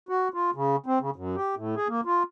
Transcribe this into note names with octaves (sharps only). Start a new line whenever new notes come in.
F#4
F4
C#3
C4
C#3
F#2
G4
A2
G#4
A#3
F4